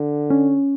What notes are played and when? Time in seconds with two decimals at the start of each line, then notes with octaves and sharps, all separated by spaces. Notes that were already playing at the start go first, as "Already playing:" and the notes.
Already playing: D3
0.30 C#4